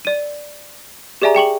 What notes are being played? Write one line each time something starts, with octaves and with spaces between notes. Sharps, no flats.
D5 D#7
G4 G#4 D5 E5 G#5 A#5
G#4 G5 C#6 F#7